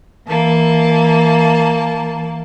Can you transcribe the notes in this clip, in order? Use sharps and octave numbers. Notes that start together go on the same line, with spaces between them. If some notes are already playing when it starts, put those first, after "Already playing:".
E3 A#3 A5